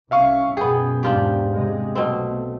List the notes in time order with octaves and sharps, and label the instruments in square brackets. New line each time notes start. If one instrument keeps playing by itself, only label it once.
[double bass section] C2 C#4 [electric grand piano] E5 F5 C#6
[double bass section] F#2 B2 [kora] B3 G#4 [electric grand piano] G5
[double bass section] E2 G#2 [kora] D4 F4 G4
[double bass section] C3 G#3
[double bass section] B1 A3 [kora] B2 C4